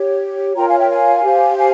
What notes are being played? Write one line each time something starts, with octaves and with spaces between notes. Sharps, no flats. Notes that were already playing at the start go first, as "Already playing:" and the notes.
Already playing: G4 C#5
F4 A#4 C#5 G5 A#5
F5 G#5
E5 G5
F5 G#5
G4 C5
F5 G#5